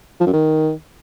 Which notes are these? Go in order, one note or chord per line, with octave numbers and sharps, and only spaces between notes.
F3
F#2
D#3